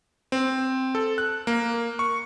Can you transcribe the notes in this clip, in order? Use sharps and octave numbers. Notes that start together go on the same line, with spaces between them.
C4
A4
F#6
A#3
C#6